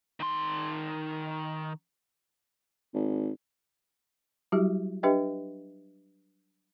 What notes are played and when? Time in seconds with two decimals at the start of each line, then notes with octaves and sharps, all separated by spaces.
0.20 D#3 C6
2.94 G#1
4.52 F#3 G3 E4 F#4 G4
5.03 D4 G4 B4 D#5 E5 G5